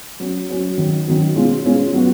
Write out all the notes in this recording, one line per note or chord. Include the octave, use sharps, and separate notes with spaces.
F#3 C#4 F#4
F#3 C#4 F#4
D#3 F#3 C#4 F#4
D#3 F#3 C#4 F#4
B2 G#3 C#4 F4
B2 G#3 C#4 F4
F#3 B3 F#4